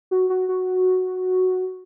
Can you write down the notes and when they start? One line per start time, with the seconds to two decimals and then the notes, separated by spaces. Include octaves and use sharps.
0.11 F#4
0.30 F#4
0.49 F#4